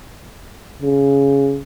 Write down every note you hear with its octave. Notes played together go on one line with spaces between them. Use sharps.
C#3